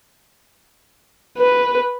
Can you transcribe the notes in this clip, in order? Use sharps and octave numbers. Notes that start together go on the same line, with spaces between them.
B4